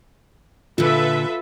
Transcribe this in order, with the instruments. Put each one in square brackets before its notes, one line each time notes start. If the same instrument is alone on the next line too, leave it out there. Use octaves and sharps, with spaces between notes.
[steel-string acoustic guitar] A#2 D3 [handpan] F4 [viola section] A4 B4 E5